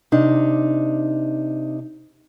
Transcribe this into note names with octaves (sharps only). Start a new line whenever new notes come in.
C3 D4 D#4